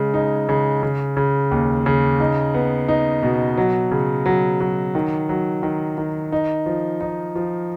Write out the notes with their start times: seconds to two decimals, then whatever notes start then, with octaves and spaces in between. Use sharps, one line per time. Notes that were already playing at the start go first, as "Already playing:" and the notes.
Already playing: C#3 G#3
0.14 D#4
0.49 C#3
0.83 C#3
1.17 C#3
1.51 D#2
1.86 C#3
2.20 D#4
2.54 B3
2.88 D#4
3.23 B2
3.57 F#3
3.91 C#3
4.26 F#3
4.60 F#3
4.95 D#3
5.29 F#3
5.63 D#3
5.98 D#3
6.32 D#4
6.66 F3
7.01 D#4
7.36 F3